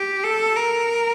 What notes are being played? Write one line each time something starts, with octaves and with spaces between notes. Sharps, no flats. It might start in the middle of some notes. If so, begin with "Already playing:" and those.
Already playing: G4
A4
A#4